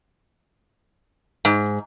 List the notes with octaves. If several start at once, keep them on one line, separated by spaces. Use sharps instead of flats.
G#2